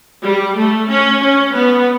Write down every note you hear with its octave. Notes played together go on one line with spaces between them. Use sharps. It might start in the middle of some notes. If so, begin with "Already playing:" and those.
G3
A3
C#4
C#4
B3